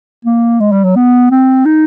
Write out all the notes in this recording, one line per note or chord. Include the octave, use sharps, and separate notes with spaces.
A#3
G#3
G3
F#3
B3
C4
D#4